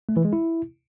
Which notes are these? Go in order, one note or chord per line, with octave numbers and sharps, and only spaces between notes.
A3
E3
G#3
E4